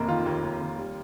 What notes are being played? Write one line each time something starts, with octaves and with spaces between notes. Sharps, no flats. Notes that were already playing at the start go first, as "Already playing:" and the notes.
Already playing: F1 D#2 A#3
D#3 F4
D#2
D#2
D#2
G3